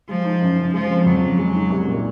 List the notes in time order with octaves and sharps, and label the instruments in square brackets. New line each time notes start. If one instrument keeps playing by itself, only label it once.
[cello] F3 [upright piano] G#3
[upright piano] D#4
F#2
C#3
[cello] F3 [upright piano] G#3
[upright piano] C4
[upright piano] F2 [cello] F#3
[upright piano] C#3
G#3
D#4
C2
A#2